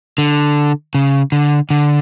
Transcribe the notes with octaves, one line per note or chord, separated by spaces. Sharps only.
D3
C#3
D3
D3